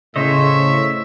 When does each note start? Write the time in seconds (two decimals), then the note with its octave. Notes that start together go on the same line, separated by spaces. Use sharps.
0.16 A2 C#3 C5 C#5 D#5 E5